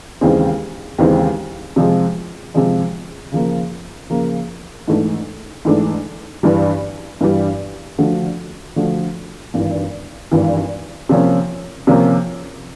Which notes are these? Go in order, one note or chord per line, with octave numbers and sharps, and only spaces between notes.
D#2 C#3 E3 G#3 C4
D#2 C#3 E3 G#3 C4
C3 F3 G#3
C3 F3 G#3
C#3 F3 A#3
C#3 F3 A#3
G#2 E3 A3 D4
G#2 E3 A3 D4
G2 E3 G3
G2 E3 G3
D3 F3 A3 D4 F#4
D3 F3 A3 D4 F#4
G#1 G2 E3
G#1 G2 E3
C3 F3 A#3 C#4
C3 F3 A#3 C#4